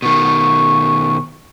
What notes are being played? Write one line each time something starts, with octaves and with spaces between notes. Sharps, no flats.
B2 D#3 C#6